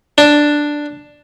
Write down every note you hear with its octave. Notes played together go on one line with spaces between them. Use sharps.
D4